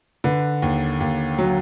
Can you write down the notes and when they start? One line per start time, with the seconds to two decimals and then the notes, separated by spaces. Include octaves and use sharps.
0.24 D3 B4
0.62 D#2
1.00 D#2
1.38 F#3